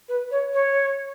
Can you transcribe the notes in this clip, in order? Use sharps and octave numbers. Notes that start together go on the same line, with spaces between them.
B4
C#5
C#5